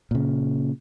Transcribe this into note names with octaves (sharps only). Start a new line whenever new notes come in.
A#2 C#3